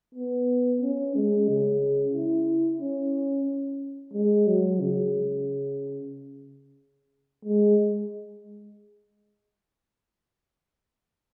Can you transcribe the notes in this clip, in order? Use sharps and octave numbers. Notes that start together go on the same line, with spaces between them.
B3
C#4
G#3
C#3
E4
C#4
G#3
F#3
C#3
G#3